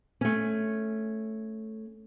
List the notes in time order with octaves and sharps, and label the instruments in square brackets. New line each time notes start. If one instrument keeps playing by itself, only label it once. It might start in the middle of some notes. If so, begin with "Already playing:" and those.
[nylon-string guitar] A3 C#4